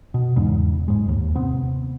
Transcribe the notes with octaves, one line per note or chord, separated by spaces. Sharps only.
B2
E2 G#2 C#3
F#1 G#2 G#3
D#2
C3 B3 C4